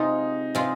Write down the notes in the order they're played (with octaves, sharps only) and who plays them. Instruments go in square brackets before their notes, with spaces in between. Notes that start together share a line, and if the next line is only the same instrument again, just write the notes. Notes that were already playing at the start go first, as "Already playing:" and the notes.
Already playing: [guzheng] C3 G#3 F4 [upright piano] D#4
[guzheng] C3 G#3 F4